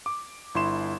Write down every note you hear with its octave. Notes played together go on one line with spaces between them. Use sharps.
D6
G1 E4 C6 E7